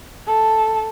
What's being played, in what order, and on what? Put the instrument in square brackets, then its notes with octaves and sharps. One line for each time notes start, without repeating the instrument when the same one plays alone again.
[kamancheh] A4